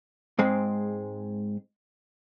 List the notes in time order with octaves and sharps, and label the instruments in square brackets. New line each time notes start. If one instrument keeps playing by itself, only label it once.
[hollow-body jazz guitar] G#2 G#3 C4